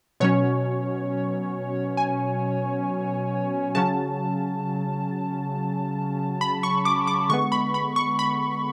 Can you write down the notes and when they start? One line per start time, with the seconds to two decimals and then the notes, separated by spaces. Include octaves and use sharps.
0.20 B2 F#3 C#4 C#5
1.97 G#5
3.75 C#3 F#3 C#4 A5
6.41 B5
6.63 C#6
6.85 D6
7.07 D6
7.29 D3 G#3 B3 C#6
7.52 B5
7.74 B5
7.96 C#6
8.19 B5